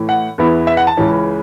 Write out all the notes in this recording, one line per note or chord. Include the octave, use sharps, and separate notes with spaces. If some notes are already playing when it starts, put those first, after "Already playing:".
Already playing: A2 E3 A3 E4
F#5
E2 E3 B3 E4
E5
F#5
A5
C#2 C#3 E3 C#4